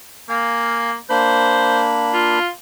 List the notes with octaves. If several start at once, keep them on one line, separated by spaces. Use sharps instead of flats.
A#3 F5 G#5
A#3 D4 C5 B5
F4